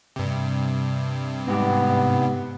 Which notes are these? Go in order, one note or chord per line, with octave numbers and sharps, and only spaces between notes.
G2 C3
G#2 B3 G4